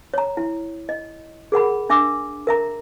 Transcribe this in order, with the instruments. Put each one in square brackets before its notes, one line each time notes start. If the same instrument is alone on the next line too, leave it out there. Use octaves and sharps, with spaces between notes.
[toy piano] C#5 A#5
E4
D#5
G#4 A#4 F#5 B5
D4 E5 D6 E6
A#4 E5 A#5